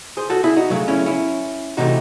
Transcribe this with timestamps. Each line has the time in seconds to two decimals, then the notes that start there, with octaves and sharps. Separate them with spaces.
0.17 G#4 C5
0.30 F#4 A4
0.44 E4 G#4
0.57 D#4 F#4
0.70 C#3 F#3 A3
0.88 C#4 E4
1.06 C#4 E4
1.77 C3 E3 A3 D#4 F#4